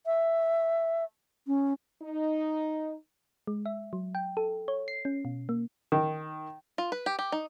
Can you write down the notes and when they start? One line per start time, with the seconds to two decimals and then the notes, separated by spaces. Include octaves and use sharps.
0.06 E5
1.47 C#4
2.01 D#4
3.47 G#3
3.66 E5
3.93 F#3
4.15 G5
4.37 A4
4.68 C#5
4.88 C7
5.05 C#4
5.25 B2
5.49 A#3
5.92 D#3
6.78 F4
6.92 B4
7.06 G4
7.19 G4
7.32 D#4